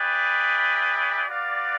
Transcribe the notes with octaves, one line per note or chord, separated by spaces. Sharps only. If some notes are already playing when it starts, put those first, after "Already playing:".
Already playing: E4 G#4 B4 D5 G5
F#4 B4 D5 F5